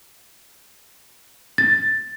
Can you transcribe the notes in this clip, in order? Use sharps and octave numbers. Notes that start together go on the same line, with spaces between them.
A6